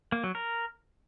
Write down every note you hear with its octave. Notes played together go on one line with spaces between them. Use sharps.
A#3
F#3
A#4